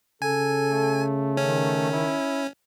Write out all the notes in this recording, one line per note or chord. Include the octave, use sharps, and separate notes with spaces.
C#3 A4 G#5
A3
D#3 C#4
E4